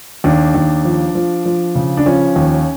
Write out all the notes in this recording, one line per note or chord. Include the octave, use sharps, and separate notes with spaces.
D#2 D4
D#2
F3
F3
F3
C#3
D4
F3 C#4
D#2